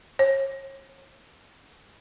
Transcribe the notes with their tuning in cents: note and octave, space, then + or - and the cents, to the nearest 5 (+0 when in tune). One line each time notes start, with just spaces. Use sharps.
C#5 -40